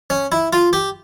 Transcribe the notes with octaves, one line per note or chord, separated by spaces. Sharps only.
C#4
E4
F4
G4